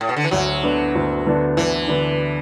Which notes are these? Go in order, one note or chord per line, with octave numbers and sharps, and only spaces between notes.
A2
B2
D3
E3
D2 F#3
D3 B3 D4
D2
D3 B3 D4
D2 E3
D3 B3 D4